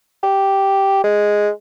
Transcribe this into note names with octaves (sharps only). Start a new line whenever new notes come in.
G4
G#3